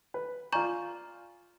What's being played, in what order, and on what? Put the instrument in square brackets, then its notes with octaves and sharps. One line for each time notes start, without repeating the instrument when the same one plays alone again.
[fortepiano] B4
[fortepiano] F4 D5 G#5 [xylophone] A#5 C#6 G6